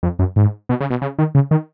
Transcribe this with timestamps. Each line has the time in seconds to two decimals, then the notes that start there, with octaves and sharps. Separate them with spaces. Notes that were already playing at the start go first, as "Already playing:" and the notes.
0.03 F2
0.19 F#2
0.36 G#2
0.69 B2
0.80 C#3
0.90 B2
1.02 C#3
1.19 D#3
1.35 C#3
1.51 D#3